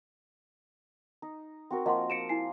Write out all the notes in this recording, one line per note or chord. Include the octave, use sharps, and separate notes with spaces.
D#4
C4 F#4 A#4
F3 A#3 D#5 F#5 C6
A#5 C#7 D7 E7
E4 G#5 C7